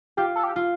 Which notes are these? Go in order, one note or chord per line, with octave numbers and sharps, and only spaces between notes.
F4 G4
A4
G4
F4